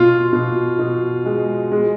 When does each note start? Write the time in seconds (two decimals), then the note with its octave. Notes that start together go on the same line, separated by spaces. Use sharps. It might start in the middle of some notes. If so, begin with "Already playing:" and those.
Already playing: B2 F4
0.33 B2
0.79 B2
1.25 G#3
1.72 G#3